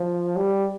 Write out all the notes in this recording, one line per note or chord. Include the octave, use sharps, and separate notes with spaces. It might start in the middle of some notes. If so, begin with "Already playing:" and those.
Already playing: F3
G3